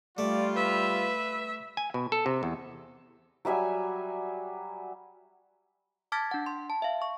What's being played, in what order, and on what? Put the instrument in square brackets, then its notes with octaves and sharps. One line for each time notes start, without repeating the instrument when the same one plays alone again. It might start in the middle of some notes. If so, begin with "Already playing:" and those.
[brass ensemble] G3 F4 [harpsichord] A3 [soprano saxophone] D5
[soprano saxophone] B4 [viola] E5
[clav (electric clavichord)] G#5
B2
A4
C3
E2
[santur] F#3 G3 E5 G#5
[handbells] A5 D6 F6 G#6 A6 B6
D4 F#5
C6
A5
E5 F5
C#6